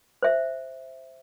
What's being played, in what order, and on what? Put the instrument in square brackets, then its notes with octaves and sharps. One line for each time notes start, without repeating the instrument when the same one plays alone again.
[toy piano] C5 E5